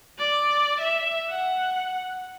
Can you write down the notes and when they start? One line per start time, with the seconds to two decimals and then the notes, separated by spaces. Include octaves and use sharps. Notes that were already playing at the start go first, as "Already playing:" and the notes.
0.18 D5
0.81 E5
1.30 F#5